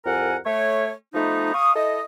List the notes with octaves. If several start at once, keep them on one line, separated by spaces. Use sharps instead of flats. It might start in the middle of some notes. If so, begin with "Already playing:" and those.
C2 F2 A#4 F#5 G#5
A3 C#5
F3 A3 B3 D#4
F5 C#6 D#6
E4 A4 D#5